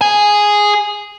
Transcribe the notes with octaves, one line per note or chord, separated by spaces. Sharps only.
G#4 G#5